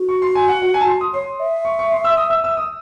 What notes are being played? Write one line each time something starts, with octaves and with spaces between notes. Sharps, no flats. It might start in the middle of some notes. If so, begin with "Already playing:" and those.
Already playing: F#4
C#6
C6
G#5
F#5
F#5
G#5
A5
C6
D#6
C#5 C6
E5
C#6
C#6
C6
E6
D#6
E6
E6
D#6